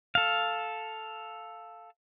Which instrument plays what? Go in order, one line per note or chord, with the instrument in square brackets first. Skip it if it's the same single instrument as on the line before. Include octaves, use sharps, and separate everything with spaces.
[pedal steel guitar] A4 F5